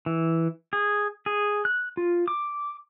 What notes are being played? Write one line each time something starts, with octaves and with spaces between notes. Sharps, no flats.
E3
G#4
G#4
F#6
F4
D6